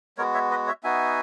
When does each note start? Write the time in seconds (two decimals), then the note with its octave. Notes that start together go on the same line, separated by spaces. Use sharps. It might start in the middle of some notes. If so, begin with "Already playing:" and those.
0.18 G#3 B3 F#4 A#4 C#5
0.34 C#5 E5
0.51 B4 D#5
0.67 C#5 E5
0.84 B3 D#4 F#4 E5 G#5